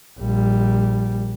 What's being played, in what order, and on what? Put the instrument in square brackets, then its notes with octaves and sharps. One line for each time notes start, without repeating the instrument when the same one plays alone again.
[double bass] A#1 G3